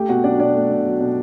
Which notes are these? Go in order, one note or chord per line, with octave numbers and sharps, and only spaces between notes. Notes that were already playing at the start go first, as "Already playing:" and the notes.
Already playing: A3 G4 G5
B2 F#4 F#5
F#3 D4 D5
B2 D4 D5
A3
B2
F#3
B2